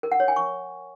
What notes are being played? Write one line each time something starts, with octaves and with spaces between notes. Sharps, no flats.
A#4
F#5
C#5
G#5
C#6